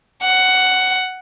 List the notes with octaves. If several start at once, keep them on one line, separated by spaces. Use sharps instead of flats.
F#5